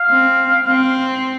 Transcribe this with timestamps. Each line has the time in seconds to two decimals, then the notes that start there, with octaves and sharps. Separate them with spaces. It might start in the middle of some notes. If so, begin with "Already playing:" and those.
Already playing: F5
0.09 C4
0.66 C4